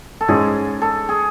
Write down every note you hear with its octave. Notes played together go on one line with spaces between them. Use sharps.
A4
G#2 G#3 C#4 G#4
A4
G#4